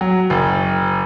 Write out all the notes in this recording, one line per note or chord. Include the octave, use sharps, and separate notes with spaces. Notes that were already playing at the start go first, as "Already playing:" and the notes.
F#3
F#1